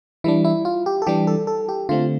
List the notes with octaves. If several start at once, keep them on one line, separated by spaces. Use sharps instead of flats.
E3 G3 D4 E4
E4
F4
G4
A4
E3 G3 D4 G4
A4
A4
G4
D3 A3 C4 F4